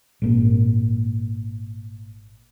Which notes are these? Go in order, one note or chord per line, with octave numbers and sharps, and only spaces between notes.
G#1 A#2